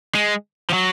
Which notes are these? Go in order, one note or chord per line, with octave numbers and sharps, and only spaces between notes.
G#3
F3
F#3